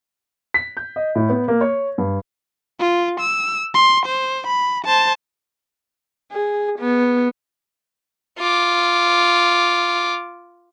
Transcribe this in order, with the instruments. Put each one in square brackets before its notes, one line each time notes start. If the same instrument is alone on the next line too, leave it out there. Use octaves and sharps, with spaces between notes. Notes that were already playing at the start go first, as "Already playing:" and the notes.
[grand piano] B6
G6
D#5
A2
B3
A#3
C#5
G2
[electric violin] F4
E6
C6
C5
B5
C5 A5
[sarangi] G#4
B3
[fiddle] F4 D6